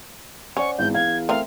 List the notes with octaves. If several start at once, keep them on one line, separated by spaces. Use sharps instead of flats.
C#4 C5 D5 F#5 C#6
G#1 E2 G6
F5 G#6
A3 C4 A#4 F5